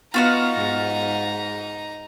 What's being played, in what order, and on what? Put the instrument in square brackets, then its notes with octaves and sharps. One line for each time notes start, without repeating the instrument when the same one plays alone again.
[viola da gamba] B3 [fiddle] D#4 A#5 [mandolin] F4 F#4 F5
[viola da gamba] G#2